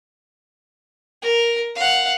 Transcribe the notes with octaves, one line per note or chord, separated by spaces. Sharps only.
A#4
F5 F#5